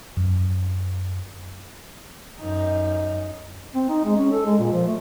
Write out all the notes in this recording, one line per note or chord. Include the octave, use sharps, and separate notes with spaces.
F#2
F#2 D#4
C4
D#4
G#3
C#4
A4
G#3
A#2
F3
A3